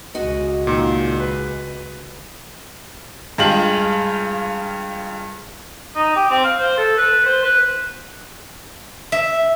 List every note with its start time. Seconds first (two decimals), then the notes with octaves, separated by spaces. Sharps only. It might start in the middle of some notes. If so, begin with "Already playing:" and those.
0.15 C#2 C#3 G#3 F#4 D#5
0.67 A#2 D#3
1.20 B4
3.38 G2 G#3 F4 G4 F#7
5.95 D#4
6.16 G4
6.31 C4
6.44 F5
6.59 C5
6.77 A4
6.97 B4
7.25 C5
7.44 B4
9.12 E5